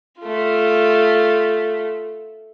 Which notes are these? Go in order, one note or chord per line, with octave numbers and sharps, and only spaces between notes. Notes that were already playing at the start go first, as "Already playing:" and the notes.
A3 F4